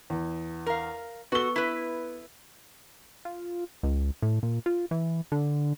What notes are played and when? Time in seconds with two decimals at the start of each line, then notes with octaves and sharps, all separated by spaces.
0.10 E2
0.66 A#4 F5
1.32 B3 F#4 A4 G7
1.56 E4 B4
3.25 F4
3.83 C#2
4.22 A2
4.43 A#2
4.66 F4
4.91 E3
5.32 D3